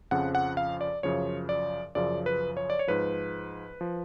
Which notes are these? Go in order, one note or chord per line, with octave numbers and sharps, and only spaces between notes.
F2 C#3 F3 F#5
F#5
F5
D5
F#2 C#3 F3 C#5
D5
F#2 C#3 F3 D5
B4
C#5
D5
C#5
G#2 F3 B4
F3